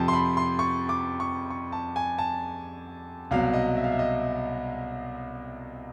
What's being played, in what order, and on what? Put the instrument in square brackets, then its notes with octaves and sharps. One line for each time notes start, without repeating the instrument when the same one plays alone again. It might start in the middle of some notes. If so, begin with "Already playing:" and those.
Already playing: [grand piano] F2 C3 F3 G5 A5
C6
B5
C6
C#6
D6
C#6
C#6
A5
G#5
A5
C2 B2 F#3 F5
D#5
E5
F5
E5
D#5